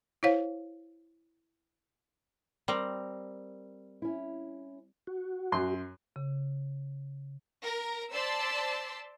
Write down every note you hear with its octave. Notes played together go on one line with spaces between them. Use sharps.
E4 C5 C#5 F5
G3 C4 A#4
C#4 E4
F#4
F#2 C6
C#3
A#4 A#5
C5 D5 A5 C6 E6 B6